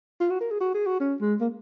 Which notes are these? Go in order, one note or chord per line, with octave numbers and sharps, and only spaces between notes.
F4
F#4
A#4
G#4
F#4
G#4
F#4
C#4
G#3
A#3